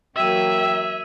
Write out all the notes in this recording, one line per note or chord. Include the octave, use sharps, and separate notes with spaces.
E3 F#3 A#3 E5 G5 E6 G#6 D#7